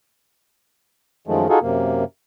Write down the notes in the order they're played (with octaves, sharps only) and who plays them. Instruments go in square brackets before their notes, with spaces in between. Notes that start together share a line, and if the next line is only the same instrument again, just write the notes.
[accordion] F#2 D#3 F3 G#3 A3
D#4 F4 F#4 G#4 A4
F#2 C3 A#3